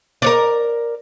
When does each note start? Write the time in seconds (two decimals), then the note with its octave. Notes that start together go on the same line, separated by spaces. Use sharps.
0.22 A#4 C#5 D5